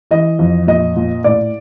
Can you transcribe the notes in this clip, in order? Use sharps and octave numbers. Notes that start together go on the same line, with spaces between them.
E3 D#5
F2
A#2 D#5
A#2
A2 D5